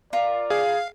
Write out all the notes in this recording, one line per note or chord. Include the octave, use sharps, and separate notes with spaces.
F4 A#4 D5
G#4 F5